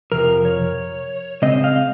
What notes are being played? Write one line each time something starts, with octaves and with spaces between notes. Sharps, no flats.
F2 C3 F3 A#4
C#5
C#3 G#3 C4 D#5
F5